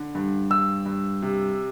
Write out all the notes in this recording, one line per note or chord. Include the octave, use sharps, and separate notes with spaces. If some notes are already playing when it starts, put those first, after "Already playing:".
Already playing: D3
G2
G2 E6
G2
C3